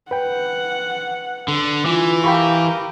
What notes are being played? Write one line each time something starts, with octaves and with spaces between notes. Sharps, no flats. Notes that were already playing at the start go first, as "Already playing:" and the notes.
B4 F#5 G5
D3
E3 F4
G4 A#4 F5 G5 B5 C#6